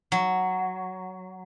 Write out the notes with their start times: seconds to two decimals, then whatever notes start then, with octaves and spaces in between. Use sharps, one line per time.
0.12 F#3